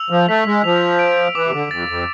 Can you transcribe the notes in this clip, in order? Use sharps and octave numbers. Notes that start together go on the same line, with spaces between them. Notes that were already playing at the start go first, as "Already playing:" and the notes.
Already playing: E6 F7
F3
A3 B6
G#3
F3 F7
D7
E3 D6
C3
D3
F2 A6
F2